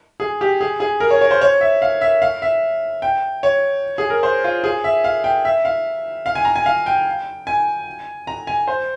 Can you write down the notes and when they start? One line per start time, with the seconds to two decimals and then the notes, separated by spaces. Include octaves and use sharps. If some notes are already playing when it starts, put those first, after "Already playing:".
0.20 G#4
0.41 G4
0.61 G#4
0.80 G#4
1.00 A#4
1.11 C#5
1.21 C#5
1.31 C5
1.41 C#5
1.61 E5
1.82 F5
2.01 E5
2.22 F5
2.42 E5
3.02 G5
3.43 C#5
3.98 G#4
4.10 A#4
4.23 C5
4.44 F4
4.64 G#4
4.84 E5
5.04 F5
5.24 G5
5.45 E5
5.65 F5
6.26 F5
6.35 G#5
6.45 A#5
6.56 G#5
6.66 F5
6.86 G5
7.47 G#5
8.27 A#5
8.47 G#5
8.68 C5